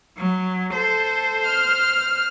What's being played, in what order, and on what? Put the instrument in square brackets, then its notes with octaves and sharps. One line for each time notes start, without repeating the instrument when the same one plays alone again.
[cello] F#3
[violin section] A4 [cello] C5
[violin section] F6